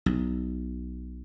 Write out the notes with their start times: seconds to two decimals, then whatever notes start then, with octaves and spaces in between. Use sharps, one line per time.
0.06 B1